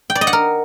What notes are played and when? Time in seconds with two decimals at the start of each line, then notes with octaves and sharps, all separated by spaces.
0.10 G5
0.15 D5
0.21 D#5
0.27 F#5
0.33 A#4